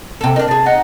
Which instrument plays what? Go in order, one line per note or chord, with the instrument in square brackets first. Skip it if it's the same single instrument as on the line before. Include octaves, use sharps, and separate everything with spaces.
[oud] C3 A4
[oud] D4 D#4 [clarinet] A#4
[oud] C3 G#4 [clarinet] A5
[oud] D#4 [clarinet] F#5